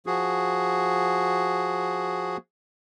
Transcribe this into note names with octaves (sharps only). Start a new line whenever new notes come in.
F3 F#4 G#4